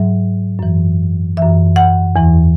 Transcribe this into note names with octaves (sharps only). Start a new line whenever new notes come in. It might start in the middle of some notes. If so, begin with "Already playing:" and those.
Already playing: G#2 F#3 E5
F#2 E3
F#2 E3 E5
F#5
E2 E3